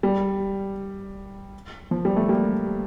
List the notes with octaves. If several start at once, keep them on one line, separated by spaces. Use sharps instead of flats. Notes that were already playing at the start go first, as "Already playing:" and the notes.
G3
F3
G3
A3
G3 A#3